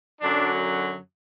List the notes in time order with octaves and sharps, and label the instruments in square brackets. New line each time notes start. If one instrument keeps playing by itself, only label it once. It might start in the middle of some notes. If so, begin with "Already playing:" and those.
[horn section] F#2 D3 F#3 D4